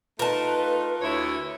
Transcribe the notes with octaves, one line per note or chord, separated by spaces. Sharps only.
A3 D#4 F4 A#4 B4 A5
D2 E4 C#5